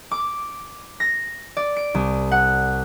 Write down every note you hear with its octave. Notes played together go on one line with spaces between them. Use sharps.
D6
A#6
D5
D7
C2
F#5